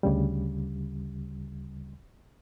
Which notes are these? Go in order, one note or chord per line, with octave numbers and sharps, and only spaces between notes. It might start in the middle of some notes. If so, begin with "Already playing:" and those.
D2 C#3 G3